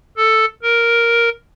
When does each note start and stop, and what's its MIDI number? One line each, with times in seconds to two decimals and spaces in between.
0.17 0.45 69
0.62 1.29 70